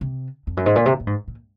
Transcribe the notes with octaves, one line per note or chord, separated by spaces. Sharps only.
C3
F2
F#2
G#2
A#2
C3
A#2
G#2
A#2